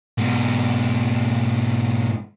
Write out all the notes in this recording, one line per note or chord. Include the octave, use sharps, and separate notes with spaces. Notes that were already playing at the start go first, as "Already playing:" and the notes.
G#2 B2